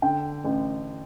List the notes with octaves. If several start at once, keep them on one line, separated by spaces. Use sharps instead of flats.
D3 G5
A1